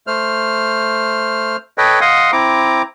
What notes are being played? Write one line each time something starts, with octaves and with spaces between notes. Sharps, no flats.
A3 C5 F6
A4 B4 C#5 D#5 G5
D#5 F5 F#5 C6 D#6
C4 E4 A#5 D6